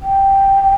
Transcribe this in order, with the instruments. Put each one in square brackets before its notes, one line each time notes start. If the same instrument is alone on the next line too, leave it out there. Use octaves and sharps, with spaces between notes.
[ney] G5